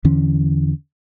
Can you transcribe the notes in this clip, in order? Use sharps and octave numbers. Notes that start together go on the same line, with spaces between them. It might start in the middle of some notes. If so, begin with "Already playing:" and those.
E2 D3 E3 C#4